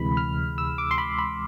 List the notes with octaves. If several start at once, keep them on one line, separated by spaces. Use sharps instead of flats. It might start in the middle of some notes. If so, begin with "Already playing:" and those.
Already playing: D2 C3 E3 G#3 B5
F6
E6
D6
C6
B5
B5